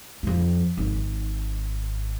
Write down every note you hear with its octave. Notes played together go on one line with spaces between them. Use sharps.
F2 E3
G#1